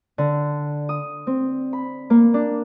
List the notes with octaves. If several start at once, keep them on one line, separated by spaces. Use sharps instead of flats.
D3
D#6
C4
B5
A#3
D4